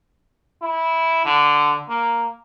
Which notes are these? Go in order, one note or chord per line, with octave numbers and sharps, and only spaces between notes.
E4
D3
A#3